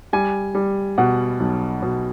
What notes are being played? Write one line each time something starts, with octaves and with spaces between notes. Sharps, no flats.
G3 G#5
G3
B2 F#5
B1
B2